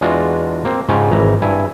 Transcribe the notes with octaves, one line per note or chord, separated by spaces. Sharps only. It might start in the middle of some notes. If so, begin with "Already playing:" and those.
E2 G#3 D4 F4 F#4
A#3 C4
G#2 C#3 C#4 F4 G4
G#1 E3 A#5
G2 E4 G#5